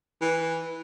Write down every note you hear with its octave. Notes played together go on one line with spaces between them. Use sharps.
E3